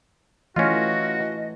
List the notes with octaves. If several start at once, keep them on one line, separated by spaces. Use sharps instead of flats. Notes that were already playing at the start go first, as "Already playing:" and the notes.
E3 A3 C#4 F4 F#4 D#5